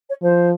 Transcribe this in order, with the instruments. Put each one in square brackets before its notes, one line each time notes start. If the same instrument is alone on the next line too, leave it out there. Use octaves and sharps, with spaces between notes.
[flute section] C#5
[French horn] F3 [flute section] C5